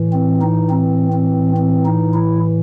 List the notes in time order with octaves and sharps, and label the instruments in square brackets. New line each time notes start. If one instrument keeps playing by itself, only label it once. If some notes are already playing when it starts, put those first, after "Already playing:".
Already playing: [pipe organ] A2 E3
C4
D#4
C4
C4
C4
D#4
E4